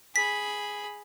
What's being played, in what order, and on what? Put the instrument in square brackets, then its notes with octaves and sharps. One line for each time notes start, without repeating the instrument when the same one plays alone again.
[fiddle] G#4 B5 [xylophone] B6